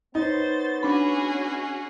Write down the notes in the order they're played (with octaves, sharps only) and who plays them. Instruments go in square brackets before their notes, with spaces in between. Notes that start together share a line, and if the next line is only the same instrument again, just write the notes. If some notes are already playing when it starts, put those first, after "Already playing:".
[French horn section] B3 C#5 [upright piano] D#4 [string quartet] C5 A6
[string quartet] C#4 F#4 G#4 [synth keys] D4 B5